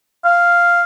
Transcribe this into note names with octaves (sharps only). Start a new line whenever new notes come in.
F5